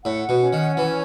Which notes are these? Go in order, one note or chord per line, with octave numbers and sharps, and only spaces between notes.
A2 F#5
B2
C#4
D#3
E3 C#5